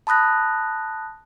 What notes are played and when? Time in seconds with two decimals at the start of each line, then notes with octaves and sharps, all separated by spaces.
0.07 A5 B5 D#6 F#6 A#6